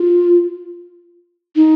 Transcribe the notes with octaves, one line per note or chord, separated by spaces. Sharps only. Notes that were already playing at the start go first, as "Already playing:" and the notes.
Already playing: F4
D#4